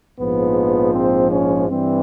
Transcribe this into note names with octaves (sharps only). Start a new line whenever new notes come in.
A#1 G#2 F3 B3
C4
C#4
G2 E3 G3 C4